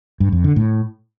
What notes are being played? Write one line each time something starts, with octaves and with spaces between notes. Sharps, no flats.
G2
F2
D3
A2